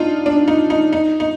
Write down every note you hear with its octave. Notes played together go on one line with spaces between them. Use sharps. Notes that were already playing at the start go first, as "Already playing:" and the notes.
Already playing: D4 D#4 F4
D4
D#4
D#4
D#4
D#4